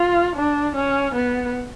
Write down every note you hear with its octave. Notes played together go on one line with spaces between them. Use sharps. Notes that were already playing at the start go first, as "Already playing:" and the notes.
Already playing: F4
D4
C#4
B3